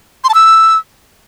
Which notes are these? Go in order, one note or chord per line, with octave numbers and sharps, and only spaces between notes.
C6
A5
E6